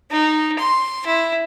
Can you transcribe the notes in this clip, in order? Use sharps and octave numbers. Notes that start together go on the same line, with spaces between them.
D#4
C6
E4